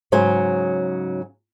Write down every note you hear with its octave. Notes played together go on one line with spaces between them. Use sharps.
G#2 C#3 F#3 C5 G#5